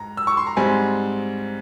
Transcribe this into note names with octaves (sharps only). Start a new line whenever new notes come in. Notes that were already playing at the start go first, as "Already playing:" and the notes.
Already playing: G#2 A#5
E6
C#6
C6
A#5
G#2 G3 C4 G#5